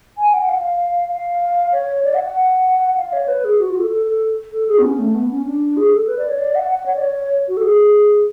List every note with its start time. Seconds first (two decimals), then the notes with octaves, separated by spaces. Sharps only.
0.18 G#5
0.33 F#5
0.49 F5
1.11 F5
1.72 C#5
2.05 D5
2.14 F#5
2.25 F#5
2.97 F5
3.13 C#5
3.28 B4
3.44 G#4
3.59 F#4
3.70 F4
3.80 A4
3.91 A4
4.06 A4
4.52 A4
4.68 G#4
4.79 B3
4.83 C#4
4.99 A3
5.15 B3
5.31 C#4
5.46 D4
5.77 G#4
5.93 A4
6.08 B4
6.18 D5
6.29 C#5
6.39 D5
6.55 F#5
6.71 F#5
6.86 C#5
6.96 D5
7.02 C#5
7.48 F#4
7.57 A4
7.64 G#4